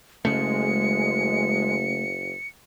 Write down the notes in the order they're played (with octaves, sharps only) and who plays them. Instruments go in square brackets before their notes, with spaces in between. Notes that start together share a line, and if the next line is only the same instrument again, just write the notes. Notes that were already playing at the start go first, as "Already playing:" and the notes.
[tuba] F#1 [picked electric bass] C#3 A3 [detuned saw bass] G#3 [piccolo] C#7